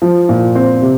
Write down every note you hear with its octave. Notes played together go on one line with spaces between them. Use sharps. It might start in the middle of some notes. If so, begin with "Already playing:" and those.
F3
A#2
C4
C3